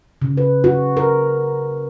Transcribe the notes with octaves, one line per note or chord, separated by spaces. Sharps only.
C#3
B4
F#4
A#4